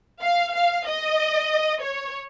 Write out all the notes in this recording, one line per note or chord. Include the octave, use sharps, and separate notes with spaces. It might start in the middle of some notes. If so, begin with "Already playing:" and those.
F5
F5
D#5
C#5